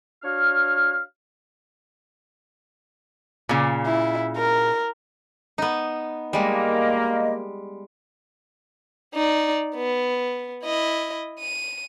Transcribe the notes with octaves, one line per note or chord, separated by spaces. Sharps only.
D4 F#4 C#5 F5 F6
A#2 C#3
E4
A#4
B3 D#4
G3 G#3 A#3 D#5
D#4 D5
B3
E4 D#5
D#7